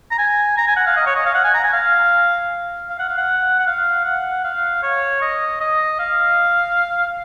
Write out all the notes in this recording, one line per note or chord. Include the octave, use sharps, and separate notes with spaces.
A#5
G#5
A#5
G#5
F#5
F5
D#5
C#5
D#5
F5
F#5
G#5
A#5
G#5
F5
F5
F#5
F5
F#5
F#5
F5
F#5
F5
C#5
D#5
D#5
F5